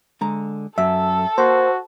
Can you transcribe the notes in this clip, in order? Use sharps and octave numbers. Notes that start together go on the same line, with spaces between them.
D3 G#3 A#5
F#2 A4 E5
A#3 F#4 C5